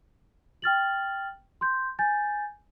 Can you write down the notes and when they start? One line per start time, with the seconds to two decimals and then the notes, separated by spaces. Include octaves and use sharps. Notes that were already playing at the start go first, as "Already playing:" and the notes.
0.62 G5 F6 A6 F#7
1.61 C6 G6
1.99 G#5 G6 A6